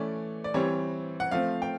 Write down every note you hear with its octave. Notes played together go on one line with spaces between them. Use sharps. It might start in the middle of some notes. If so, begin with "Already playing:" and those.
Already playing: E3 A3 C#4 D5
D5
E3 G3 C4 C#5
F#5
F3 A3 C4 F5
G5